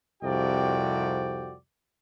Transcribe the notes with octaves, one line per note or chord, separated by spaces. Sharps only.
C2 F2 C3 F#4 D5 G5